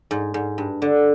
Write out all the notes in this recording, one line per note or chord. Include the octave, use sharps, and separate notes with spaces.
G#2
G#2
G2
D3